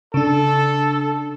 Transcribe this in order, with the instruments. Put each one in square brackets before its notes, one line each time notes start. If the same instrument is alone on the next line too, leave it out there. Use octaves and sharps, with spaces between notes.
[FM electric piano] C#3 D4 [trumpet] A4